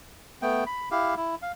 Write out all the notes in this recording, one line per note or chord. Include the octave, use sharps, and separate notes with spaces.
A3 B3 G5
B5
E4 G4 F5
E4
F5